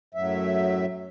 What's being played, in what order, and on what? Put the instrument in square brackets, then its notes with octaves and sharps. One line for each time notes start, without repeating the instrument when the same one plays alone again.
[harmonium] F#2 A2 F#3 E5